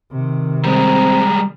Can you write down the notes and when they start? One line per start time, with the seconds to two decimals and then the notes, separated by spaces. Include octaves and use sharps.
0.11 C3 D#3
0.65 G3 G#3 C4 A#5